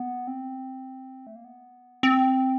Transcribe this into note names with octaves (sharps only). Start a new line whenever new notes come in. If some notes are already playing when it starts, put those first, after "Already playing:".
Already playing: B3
C4
A3
A#3
B3
C4